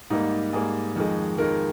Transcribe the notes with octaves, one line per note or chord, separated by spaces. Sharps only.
G#2 G3 A#3 D#4
G#2 G3 A#3 G#4
F2 D#3 G#3
F2 D#3 G#3 A#4